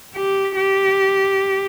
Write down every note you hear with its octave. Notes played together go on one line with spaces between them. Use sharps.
G4
G4